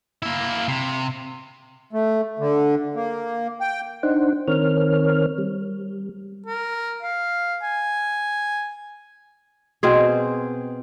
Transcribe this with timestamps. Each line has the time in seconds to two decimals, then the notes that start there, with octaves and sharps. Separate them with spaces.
0.22 A#3 E4
0.68 C3
1.93 A3
2.39 D3
2.95 A#3
3.61 G5
4.03 D4 D#4 C5 F#5
4.48 D#3 C4 A#4 C#5 F6
5.38 G3
6.46 A#4
7.03 F5
7.63 G#5
9.83 B2 C4 G#4